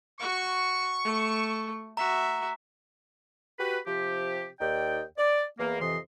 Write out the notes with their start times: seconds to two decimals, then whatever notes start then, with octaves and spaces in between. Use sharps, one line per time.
0.20 F#4 C#6
1.04 A3
1.97 F#4 E5 A#5 B6
3.59 F#4 G4 B4
3.86 C3 F3 G4
4.60 D#2 D#4 D5 G5
5.18 D5
5.58 E2 A#3
5.81 F2 C3 E3 D#5 C6